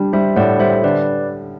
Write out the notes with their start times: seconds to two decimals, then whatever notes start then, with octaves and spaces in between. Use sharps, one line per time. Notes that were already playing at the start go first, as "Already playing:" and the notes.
Already playing: G3 D4
0.13 G3 C5 E5
0.36 A2 D5 F#5
0.60 G3 C5 E5
0.83 D3 B4 D5